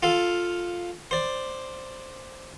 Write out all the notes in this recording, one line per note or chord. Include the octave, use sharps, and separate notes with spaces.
F4 A4 F5
C5 D5